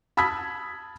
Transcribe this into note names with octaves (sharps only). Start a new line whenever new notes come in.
A5 B5 D#6 E6 G#6 B6